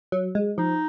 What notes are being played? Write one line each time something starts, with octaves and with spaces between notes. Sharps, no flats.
F#3
G#3
F3 D#4